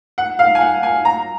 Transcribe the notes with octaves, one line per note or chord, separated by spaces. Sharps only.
F#5
F5
G#5
F#5
G#5
A#5